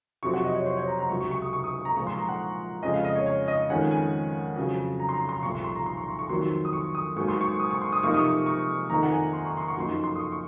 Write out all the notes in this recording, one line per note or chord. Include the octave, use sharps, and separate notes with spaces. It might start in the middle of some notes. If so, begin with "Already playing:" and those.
F2 C3 F#3 C4 C#6
F#5
D#5
C#5
C5
C#5
A#5
A#5
C#2 C3 F#3 C#6
C#6
C#6
D#6
C#6
D#6
C#6
A#5
A#2 F3 G#3 C4 F4 C#6
C6
A#5
F#5
F2 C#3 G#3 D#5
F5
D#5
C#5
C#5
D#5
F2 D#3 G#3 C#4 F#5
G#5
F2 C#3 F#3
A#5
C6
A#5
C6
C2 A#2 F3 C#6
C#6
C6
A#5
C6
C#6
C6
C#6
F2 D#3 F#3 A#3 C6
D#6
C#6
D#6
G#2 F#3 A#3 C#6
C6
C#6
D#6
C#6
C6
D#6
C3 F3 A#3 D#4 C#6
D#6
C#6
C#6
F2 D#3 A#3 D#4 A#5
F#5
G#5
C6
C#6
C6
C#6
F#2 F3 A#3 D#4 C6
C#6
C6
D#6
C#6
C#6